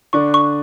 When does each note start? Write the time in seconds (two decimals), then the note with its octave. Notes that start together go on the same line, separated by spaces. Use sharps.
0.13 D3 D4 C#6
0.34 C#6